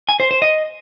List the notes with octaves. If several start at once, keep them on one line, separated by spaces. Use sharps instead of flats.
G#5
C5
C5
D#5